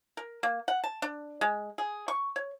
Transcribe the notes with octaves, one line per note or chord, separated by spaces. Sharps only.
A#4
A#3
F#5
A5
D4
G#3
G#4
C#6
C#5